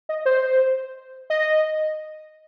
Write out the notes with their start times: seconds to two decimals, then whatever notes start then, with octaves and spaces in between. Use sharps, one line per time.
0.09 D#5
0.26 C5
1.30 D#5